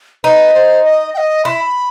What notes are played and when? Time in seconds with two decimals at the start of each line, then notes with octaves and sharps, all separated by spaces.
0.24 D#4 B4
0.54 C5
0.84 D#5
1.14 G5
1.17 D#5
1.45 E4 B5 C6